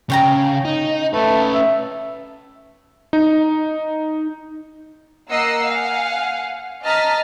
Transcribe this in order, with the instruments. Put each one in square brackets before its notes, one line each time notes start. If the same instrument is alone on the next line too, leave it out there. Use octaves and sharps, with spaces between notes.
[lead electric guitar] C#3 [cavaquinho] C#5 G5 A#5
[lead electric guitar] D#4
[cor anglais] A3 [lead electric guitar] C#4 B4
[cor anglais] E5
[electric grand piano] D#4
[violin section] A#3 D#5 F#5 A#5 E6 C7
F5 F#5 G#5
D#5 A5 A#5 F6 A6 B6